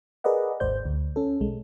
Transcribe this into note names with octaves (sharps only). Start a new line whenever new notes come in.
G#4 A#4 B4 D5 D#5 F#5
G#1 D#2 G#2 C5 D5 G6
D2
C#4 A4
B1 G#3